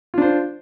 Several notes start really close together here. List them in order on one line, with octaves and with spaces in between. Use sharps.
F4 D4 C5